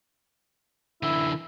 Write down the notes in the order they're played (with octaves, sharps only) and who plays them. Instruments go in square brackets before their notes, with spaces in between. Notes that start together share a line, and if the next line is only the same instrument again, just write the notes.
[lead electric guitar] D3 E3 [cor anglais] E4